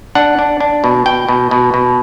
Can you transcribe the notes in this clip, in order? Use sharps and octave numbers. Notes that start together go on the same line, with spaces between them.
D4 F#5
D4
D4
B2
B2 G5
B2
B2
B2